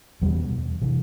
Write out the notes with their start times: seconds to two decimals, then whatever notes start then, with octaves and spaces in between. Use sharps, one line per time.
0.21 E2 B2 G3
0.82 C3 E3